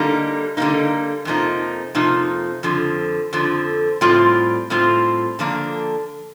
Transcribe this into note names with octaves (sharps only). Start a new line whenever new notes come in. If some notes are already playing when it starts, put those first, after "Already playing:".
Already playing: D3 G3 A#3 D#4
D3 G3 A#3 D#4
F2 C3 F3 A#3 D#4
F2 C3 F3 A#3 D#4
F2 D3 F3
F2 D3 F3
A2 G3 C4 F4
A2 G3 C4 F4
D3 F3 A#3 D4